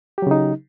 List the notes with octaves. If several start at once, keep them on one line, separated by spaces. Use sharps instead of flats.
C#3 F#3 D#4 G4